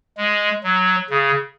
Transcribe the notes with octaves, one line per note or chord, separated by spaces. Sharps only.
G#3
F#3
C#3